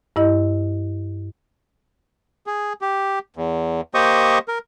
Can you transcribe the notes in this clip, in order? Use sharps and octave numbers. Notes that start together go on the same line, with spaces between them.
G2 E4 D#5
G#4
G4
E2
A#3 G4 C5 D#5 C#6 D#6
A#4